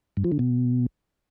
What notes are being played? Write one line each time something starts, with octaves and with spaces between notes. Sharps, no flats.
G2
F3
D3
B2